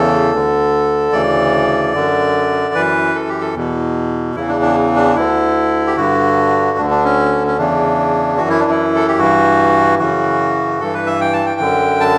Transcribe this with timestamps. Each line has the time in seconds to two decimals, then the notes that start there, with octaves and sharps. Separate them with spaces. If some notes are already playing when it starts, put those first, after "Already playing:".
Already playing: E2 C#3 E3 A4
0.32 D2 D3
1.13 D2 C#3 E3 D5
1.94 F#2 D3
2.74 F#2 E3 B4
3.15 A4
3.28 G4
3.41 A4
3.54 E2 B2
4.35 E2 C#3 E3 E4
4.48 D4
4.62 D4
4.96 D4
5.16 D2 D3 E4
5.87 G4
5.97 G2 D3 F#4
6.78 D2 D4
6.82 D3
6.90 D4
7.04 C#4
7.47 C#4
7.58 E2 C#3 E3 D4
8.38 F#2 E3 F#4
8.50 E4
8.60 D4
8.71 E4
8.96 A4
9.08 G4
9.19 G2 E3 F#4
9.99 F#2 C#3 E3 F#4
10.80 G2 E3 A4
10.94 B4
11.06 E5
11.21 G5
11.33 A5
11.46 G5
11.60 F#2 D3
12.00 A5